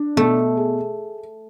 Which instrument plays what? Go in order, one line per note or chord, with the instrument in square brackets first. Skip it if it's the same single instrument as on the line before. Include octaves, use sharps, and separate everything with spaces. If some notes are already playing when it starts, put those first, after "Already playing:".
Already playing: [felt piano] D4
[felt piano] B2 [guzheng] A3
[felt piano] G#4